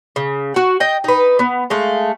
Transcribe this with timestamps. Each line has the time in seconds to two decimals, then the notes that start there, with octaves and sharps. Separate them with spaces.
0.16 C#3
0.54 F#4 F#5
0.80 D#5 G5
1.04 D#4 B4
1.39 B3
1.70 G#3 A3 F5